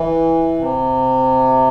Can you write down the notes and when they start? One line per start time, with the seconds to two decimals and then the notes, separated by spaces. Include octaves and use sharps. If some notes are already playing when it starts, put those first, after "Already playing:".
Already playing: E3
0.58 C3